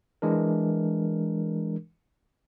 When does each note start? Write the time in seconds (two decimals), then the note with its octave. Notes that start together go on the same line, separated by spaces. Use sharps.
0.22 E3 G#3 D4 A#4